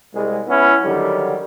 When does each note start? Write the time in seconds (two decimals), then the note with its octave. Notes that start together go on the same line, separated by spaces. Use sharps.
0.13 C2 G#3
0.47 B3 C#4 E4
0.82 D3 D#3 F#3 G3